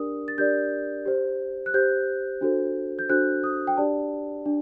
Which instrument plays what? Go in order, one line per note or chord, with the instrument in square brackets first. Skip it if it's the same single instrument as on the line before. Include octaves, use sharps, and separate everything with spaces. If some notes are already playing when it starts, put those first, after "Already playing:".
Already playing: [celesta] D4 G4 A#4 D5 D#6
A6
D4 G4 A#4 D5 G6
G4 C5
F#6
G4 C5 G6
D4 F#4 A4 C5
G6
D4 F#4 A4 C5 F#6
D#6
G5
D4 G4 D5 A5
D4